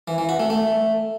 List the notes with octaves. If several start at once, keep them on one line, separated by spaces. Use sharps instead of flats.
E3
E3
F#4
A3
A3